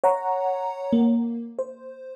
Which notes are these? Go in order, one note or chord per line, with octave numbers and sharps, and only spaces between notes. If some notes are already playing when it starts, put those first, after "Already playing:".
C#5 F#5 A#5
A#3
C5